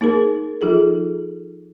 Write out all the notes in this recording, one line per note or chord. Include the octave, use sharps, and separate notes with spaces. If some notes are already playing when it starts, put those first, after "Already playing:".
A#3 D#4 G#4 A#4
F3 D#4 F4 G#4 A4